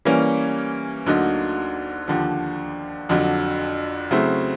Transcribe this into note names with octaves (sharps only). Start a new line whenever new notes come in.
E3 G3 A#3 C#4
D2 D3 F#3 A#3 D#4
D#2 D3 F3
F2 D3 F#3
C#3 F#3 A3 C4 E4